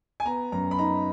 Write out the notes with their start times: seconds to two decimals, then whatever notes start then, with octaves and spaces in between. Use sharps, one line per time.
0.20 G#5
0.25 B3 A#5
0.52 F#2 A#5
0.71 B5
0.78 D#4 A#5